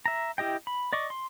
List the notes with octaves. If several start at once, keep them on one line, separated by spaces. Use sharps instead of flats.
E5 A#5
E4 G4 D#5 G5
B5
D5 D#5 C#6 D6
C6